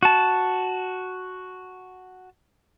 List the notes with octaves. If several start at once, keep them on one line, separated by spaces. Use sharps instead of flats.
F#4 A5